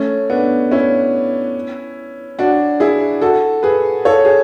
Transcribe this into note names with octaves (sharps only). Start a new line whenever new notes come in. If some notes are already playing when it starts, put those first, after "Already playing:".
Already playing: A3 C#4
B3 D4
C#4 E4
D4 F#4
E4 G#4
F#4 A4
G#4 B4
A4 C#5
G#4